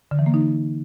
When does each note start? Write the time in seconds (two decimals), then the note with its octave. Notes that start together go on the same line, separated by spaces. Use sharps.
0.11 D3
0.19 E3
0.26 A#3
0.34 D#4